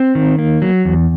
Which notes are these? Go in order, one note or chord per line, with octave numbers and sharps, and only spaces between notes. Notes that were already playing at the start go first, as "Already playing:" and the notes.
Already playing: C4
D#3
A#3
F#3
E2